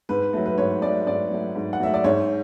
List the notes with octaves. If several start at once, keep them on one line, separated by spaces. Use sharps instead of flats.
G#2 B4
F#3 A3
B4
G#2 C#5
F#3 A3 D5
G#2 D5
F#3 A3
G#2
F#5
F#3 A3 E5
D5
G#2 C#5